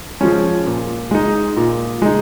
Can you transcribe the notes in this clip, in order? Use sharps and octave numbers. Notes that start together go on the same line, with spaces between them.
F3 G#3 C#4
A#2
G#3 D#4
A#2
G#3 D#4